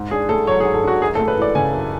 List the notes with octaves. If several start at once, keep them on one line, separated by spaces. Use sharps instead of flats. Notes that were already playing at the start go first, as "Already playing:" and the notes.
Already playing: G#2
D4 G#4
A3 A4
F#3 C#5
G#4
G#2
A4
D4 F#4
F#2 G#4
A4
A3
B4
E3 D5
C#3 G#5
F#2